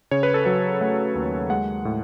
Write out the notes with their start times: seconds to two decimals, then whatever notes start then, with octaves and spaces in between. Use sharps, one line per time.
0.11 C#3 C#5
0.23 B4
0.34 A4
0.45 F#3 B4
0.81 A3 F#5
1.15 D#2
1.50 G#3 F#5
1.85 A2